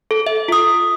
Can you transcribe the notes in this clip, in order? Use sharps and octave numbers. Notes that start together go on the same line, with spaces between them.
A4
E5
F4 D#6